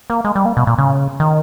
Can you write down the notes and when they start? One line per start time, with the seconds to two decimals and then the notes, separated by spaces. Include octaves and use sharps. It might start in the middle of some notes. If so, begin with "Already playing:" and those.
0.10 A#3
0.24 G#3
0.35 G3
0.45 A#3
0.57 B2
0.67 A#2
0.78 C#3
1.20 D#3